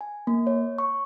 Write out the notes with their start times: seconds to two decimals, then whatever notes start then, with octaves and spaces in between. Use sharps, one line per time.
0.01 G#5
0.27 A#3
0.47 C#5
0.78 C#6